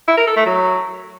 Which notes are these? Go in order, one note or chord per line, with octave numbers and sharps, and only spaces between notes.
E4
A#4
A4
A3
F#3